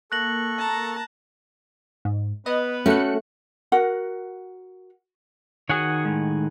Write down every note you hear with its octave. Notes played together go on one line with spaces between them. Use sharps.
A#3 A4 C#6 F#6 A#6 F#7
A5 A#5
G#2
B3 B4 D#5
A3 C#4 F#4 A4 F#6 C#7
F#4 A#4 F#5
D#3 F#4 G#4 C#5 F#5 G#5
A2 G#3